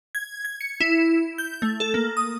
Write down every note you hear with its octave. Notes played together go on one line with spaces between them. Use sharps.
G#6
G#6
C#7
E4
G6
A3
A4
A#3
D#6